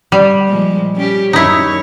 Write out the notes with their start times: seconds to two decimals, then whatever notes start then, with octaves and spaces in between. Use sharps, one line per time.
0.12 G3
0.48 A#2 F3 G#3
0.95 G3 C#4 G4
1.33 F#2 D#4 E4 C#5